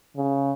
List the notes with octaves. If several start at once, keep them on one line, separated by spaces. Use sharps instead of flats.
C#3